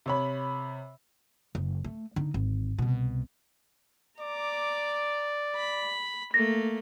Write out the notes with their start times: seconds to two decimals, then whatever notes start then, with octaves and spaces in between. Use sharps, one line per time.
0.06 C3 C#5 B5
1.55 F#1
1.84 A3
2.16 D3 D#4
2.34 G#1
2.79 C2 B2
4.20 D5 A#5 D6
5.56 B5
6.34 A3 A#3 A#6